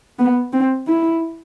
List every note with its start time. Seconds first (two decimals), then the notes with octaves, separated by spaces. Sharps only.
0.19 B3
0.53 C4
0.87 E4